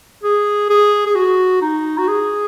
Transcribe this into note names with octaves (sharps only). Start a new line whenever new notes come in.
G#4
G#4
G#4
F#4
D#4
F#4
G#4